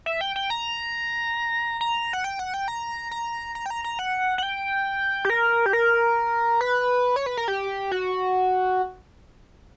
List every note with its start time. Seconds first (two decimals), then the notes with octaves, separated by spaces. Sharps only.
0.06 E5
0.21 G5
0.36 G5
0.50 A#5
1.81 A#5
2.13 F#5
2.24 G5
2.39 F#5
2.54 G5
2.68 A#5
3.11 A#5
3.55 A#5
3.66 G5
3.70 A#5
3.84 A#5
3.99 F#5
4.38 F#5
4.43 G5
5.25 G4
5.30 A#4
5.66 G4
5.73 A#4
6.61 B4
7.16 C#5
7.26 B4
7.37 A#4
7.48 G4
7.91 F#4